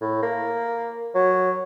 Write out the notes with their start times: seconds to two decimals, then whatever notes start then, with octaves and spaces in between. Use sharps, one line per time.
0.01 A2
0.22 A#3
1.14 F#3